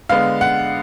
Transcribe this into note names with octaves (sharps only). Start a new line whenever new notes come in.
D3 G#3 B3 F5
F#5